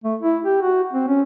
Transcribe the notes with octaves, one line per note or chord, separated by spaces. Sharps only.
A3
E4
G4
F#4
C4
C#4